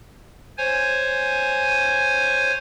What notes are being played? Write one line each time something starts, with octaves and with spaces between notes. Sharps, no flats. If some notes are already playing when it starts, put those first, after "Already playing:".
C5 C#5 G#5